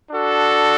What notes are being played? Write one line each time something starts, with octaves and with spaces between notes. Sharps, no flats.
D4 F#4 A4